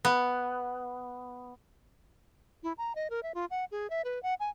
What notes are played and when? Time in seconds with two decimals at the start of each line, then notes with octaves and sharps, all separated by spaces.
0.05 B3
2.63 E4
2.78 A#5
2.95 D#5
3.10 A#4
3.23 E5
3.34 F4
3.51 F#5
3.71 G#4
3.90 E5
4.04 B4
4.23 F#5
4.40 G#5